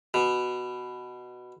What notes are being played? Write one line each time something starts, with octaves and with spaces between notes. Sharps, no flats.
B2